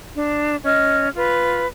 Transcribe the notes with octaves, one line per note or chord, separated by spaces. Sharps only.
D4
C#4 D#5 F6
F4 B4